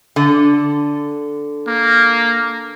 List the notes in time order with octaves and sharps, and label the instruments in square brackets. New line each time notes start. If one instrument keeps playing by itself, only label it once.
[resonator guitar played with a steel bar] D3
[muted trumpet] A#3